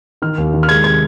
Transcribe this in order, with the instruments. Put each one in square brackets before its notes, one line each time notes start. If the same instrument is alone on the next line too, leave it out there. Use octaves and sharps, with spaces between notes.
[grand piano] D#3 F6
D#2
D#3
F6
G#3 G#6
C3 G#6